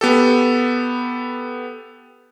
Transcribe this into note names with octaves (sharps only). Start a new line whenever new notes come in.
B3 G4 A4